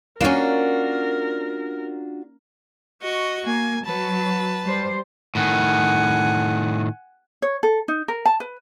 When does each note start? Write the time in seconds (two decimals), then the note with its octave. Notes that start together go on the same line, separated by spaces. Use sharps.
0.21 A#3 C#4 D4 F4 F#4 A#4
3.02 F#4 D#5 C#6
3.45 A#3 G#5
3.84 F#3 B4 A5
4.64 G3 C5
5.35 A2 D#3 F#5 G#5
7.42 C#5
7.63 A4
7.88 D#4
8.08 A#4
8.26 A5
8.40 B4